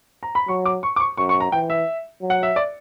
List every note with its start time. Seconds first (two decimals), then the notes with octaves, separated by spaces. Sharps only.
0.23 A#5
0.35 B5
0.48 F#3 C#6
0.65 D6
0.83 C#6
0.96 D6
1.00 C#6
1.17 F#2 C#6
1.29 C#6
1.40 A#5
1.52 E3 G5
1.70 E5
2.21 F#3
2.30 F#5
2.43 E5
2.56 D5